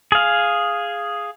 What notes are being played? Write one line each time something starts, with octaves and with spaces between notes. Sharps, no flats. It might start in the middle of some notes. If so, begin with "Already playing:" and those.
G#4 F5